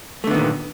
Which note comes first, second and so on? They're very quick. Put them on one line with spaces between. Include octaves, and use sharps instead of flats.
A3 D3 B3 D#3 A#2